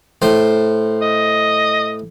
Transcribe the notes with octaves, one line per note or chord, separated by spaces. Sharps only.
A2 C5
D#5